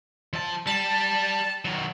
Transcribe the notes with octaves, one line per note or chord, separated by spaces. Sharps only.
F3 A5
G3 A5
D#3 F#3